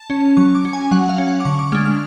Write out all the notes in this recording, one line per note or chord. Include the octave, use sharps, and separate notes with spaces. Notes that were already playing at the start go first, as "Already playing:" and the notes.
Already playing: A5
C#4
F#3 C#6
D6
C#4
G#5
F#3 F#5
F5
C#4
F#5
D6
D3 C#6
D6
G#3 D4 F6
F6